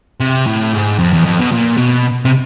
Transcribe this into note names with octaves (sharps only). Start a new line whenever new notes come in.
C3
A2
G#2
F2
E2
F2
B2
A#2
B2
C3